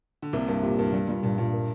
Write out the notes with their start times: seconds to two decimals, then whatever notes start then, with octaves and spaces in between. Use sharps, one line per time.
0.22 D3
0.33 C2 C3 A#3
0.48 G2 A#3
0.63 A#2 G4
0.78 G2 A#4
0.93 G2 G3
1.08 A#2 G3
1.23 G2 A#2
1.38 G2 A#2
1.53 A#4